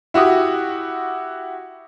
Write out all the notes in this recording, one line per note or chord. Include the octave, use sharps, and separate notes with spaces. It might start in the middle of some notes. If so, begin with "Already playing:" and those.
E4 F#4 G4 D#6